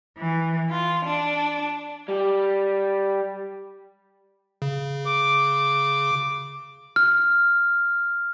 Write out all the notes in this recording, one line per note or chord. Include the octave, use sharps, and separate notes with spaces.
E3
F4
D4
G3
C#3
D6
F6